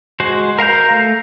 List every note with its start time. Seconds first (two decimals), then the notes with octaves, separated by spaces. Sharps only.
0.20 G#3 F#4 C5
0.58 A#4 F5 A#5 G6
0.91 A3